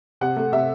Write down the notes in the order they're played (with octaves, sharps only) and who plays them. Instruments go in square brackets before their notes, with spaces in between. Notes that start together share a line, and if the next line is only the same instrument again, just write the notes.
[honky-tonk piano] C3 F#5
A3
C3 E5